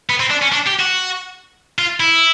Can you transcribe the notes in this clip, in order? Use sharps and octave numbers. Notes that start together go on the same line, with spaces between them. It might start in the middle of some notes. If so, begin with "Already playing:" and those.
B3
C4
D4
C#4
D4
G4
F#4
F4
E4